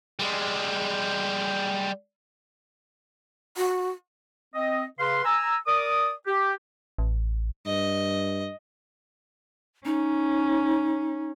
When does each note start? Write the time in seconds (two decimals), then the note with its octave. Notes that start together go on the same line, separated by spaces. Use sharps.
0.19 G3 G#3
3.57 F#4
4.55 C4 D#5
4.99 C#3 B4 F5 C6
5.25 G#5 A#5 E6
5.67 A#4 D5 D6 D#6
6.27 G4
6.98 A1
7.66 G2 D#5
9.85 C#4 D#4